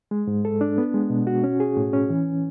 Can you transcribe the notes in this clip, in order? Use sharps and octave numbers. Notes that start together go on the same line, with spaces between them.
G#3
G#2
A4
D4
B3
G#3
B2
F#4
C#4
G#4
A2
C#4
E3